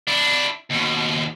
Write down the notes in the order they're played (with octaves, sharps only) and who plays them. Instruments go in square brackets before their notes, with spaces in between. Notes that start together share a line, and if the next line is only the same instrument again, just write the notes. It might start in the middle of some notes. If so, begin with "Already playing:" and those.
[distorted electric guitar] D4 E4
D#2 B2